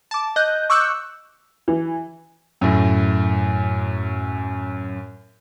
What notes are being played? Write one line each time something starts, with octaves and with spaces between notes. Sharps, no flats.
A5 D6
D#5 F#6 G6
C#6 D6 E6 F#6 G6 C#7
E3
F#2 A2